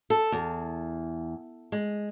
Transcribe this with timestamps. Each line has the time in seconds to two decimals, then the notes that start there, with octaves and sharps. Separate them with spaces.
0.10 A4
0.32 E2
1.72 G#3